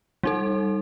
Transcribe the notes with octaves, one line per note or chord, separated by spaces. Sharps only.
G3 D#4 A4